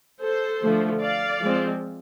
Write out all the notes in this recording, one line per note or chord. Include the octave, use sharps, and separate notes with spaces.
A4 C5
D3 F3 A3
D5 F5
F3 G#3 C4